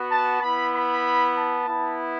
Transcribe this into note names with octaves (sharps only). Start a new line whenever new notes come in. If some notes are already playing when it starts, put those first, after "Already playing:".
Already playing: B3 F#4
A5
B3 E4 B5
B5
A5
B3 E4